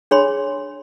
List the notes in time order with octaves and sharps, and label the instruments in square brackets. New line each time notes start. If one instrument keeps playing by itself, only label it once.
[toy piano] D4 G#4 C#5 B5 C6